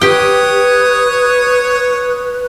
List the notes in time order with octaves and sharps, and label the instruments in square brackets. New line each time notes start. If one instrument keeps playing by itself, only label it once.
[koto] G4 G5 [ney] B4 [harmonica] C#5 D#6